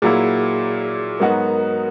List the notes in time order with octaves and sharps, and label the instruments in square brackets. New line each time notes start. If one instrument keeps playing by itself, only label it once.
[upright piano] A#2 F#3 A#3 E4 [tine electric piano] G#4
[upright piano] G#2 F#3 B3 D#4 F#4 [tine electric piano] A#4
[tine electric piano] A#4